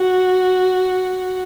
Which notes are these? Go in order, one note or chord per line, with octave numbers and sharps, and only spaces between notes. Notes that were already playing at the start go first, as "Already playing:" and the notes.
Already playing: F#4